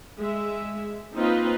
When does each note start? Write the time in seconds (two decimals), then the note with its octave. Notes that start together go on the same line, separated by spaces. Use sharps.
0.18 G#3 E5
1.15 A#3 C4 D#4 F4 B4 D#5